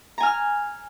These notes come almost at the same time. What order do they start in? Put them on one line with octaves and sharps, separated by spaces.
A#5 G#5 F6